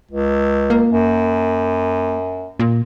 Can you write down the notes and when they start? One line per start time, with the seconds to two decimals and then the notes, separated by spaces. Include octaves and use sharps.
0.11 C#2
0.70 A#3
0.90 F#2
2.59 A#2